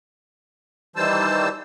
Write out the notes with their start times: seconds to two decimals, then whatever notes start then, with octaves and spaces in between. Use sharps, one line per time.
0.96 D#3 E3 G3 C5 A5 E6